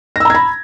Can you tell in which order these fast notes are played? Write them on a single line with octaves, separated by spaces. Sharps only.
A#6 E6 A#5 G#6 B5